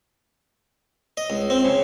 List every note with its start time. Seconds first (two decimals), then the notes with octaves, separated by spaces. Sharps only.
1.17 D#5
1.30 C#2
1.50 C4
1.65 C#3